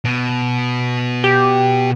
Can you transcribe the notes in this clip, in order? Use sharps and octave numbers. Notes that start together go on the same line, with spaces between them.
B2
G4